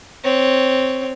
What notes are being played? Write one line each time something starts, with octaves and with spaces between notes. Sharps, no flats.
C4 C#5